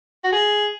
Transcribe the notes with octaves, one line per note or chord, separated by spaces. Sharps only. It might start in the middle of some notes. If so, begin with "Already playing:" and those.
F#4
G#4